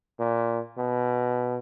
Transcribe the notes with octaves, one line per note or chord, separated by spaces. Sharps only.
A#2
B2